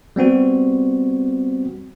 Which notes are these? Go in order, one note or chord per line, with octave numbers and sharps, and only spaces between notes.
G3 B3 C4 F#4